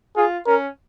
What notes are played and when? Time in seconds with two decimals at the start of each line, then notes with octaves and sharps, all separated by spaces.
0.16 F4 G#4
0.46 C#4 A#4